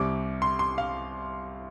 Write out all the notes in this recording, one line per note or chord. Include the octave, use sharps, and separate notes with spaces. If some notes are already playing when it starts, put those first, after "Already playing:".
Already playing: C2 C3 G3 D6
C6
C6
F5